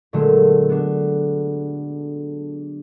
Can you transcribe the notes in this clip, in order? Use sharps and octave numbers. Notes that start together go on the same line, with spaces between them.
A#2 D3 F#3 G#3 A3
B3 D4